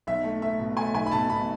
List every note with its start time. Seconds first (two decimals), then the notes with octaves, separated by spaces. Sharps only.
0.07 B1 E5
0.24 A3
0.42 A3 E5
0.60 B2
0.77 A3 G#5
0.94 B1 G#5
1.06 B5
1.12 B2 A5
1.30 B2 B5